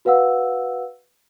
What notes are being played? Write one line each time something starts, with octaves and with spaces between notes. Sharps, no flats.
F#4 B4 F5 F#5 E6